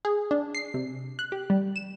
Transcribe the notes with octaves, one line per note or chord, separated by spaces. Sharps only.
G#4
D4
C7
C3
F#6
G4
G3
E7